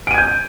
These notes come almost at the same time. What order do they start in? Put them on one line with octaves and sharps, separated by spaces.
D7 D#7 G#6 G6